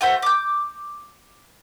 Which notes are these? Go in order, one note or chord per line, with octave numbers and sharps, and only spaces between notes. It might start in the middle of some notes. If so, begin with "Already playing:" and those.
A3 F#4 C5 E5
D6 G6